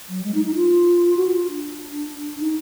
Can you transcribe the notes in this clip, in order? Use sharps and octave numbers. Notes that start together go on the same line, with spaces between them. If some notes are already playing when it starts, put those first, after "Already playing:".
F#3
G#3
D#4
D#4
F4
F#4
F4
D4
D#4